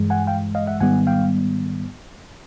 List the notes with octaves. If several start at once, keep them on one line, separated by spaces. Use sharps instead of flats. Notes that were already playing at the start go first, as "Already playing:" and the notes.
Already playing: G2 E3 G#3
F#5 G#5
F5 G5
D#5 F5
E5 F#5
G#2 D#3 G3 B3 F#5 G#5
F5 G5